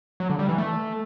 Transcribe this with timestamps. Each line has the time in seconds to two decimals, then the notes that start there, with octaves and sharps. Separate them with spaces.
0.20 F#3
0.30 D3
0.39 G3
0.49 E3
0.58 A3